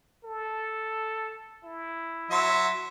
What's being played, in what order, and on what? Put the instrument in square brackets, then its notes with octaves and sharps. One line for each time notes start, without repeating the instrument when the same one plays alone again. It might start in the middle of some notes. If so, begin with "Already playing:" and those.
[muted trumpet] A4
E4
[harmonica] F#3 E5 C6